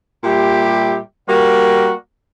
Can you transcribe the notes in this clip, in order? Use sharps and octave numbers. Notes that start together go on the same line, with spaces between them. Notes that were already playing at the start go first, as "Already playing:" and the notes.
A#2 G3 G4 E5
G3 A#3 F#4 A#4